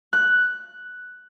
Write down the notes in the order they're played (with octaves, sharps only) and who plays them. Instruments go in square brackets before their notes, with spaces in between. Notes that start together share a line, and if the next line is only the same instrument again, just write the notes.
[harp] F#6